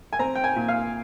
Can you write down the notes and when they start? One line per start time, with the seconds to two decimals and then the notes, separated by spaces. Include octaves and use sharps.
0.13 G#5
0.19 C4 A#5
0.35 G5
0.44 G#5
0.56 A#2
0.68 F5